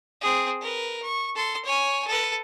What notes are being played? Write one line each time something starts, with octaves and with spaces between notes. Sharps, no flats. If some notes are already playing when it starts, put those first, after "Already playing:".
C4 G#4
A#4 B4
C#6
A4 C6
C#5 G#5
A4 B4